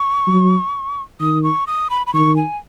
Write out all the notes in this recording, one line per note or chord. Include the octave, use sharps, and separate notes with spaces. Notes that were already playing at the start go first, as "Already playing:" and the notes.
Already playing: C#6
F#3
D#3 D#6
C#6
D#6
B5
B5
D#3 C#6
G#5